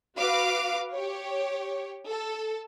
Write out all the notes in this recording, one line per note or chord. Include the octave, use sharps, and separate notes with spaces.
F#4 B4 F5 D6
G4 C#5
A4